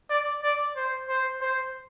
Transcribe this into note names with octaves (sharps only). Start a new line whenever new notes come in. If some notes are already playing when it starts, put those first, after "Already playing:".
D5
D5
C5
C5
C5